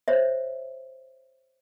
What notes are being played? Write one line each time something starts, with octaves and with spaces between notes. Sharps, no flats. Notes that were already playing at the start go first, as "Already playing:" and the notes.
C5 C#5 E5